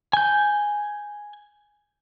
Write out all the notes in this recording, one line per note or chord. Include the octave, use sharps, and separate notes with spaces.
G#5 G6